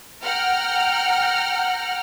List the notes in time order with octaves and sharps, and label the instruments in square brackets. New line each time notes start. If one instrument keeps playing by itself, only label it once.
[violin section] F#5 G5 A#5 F6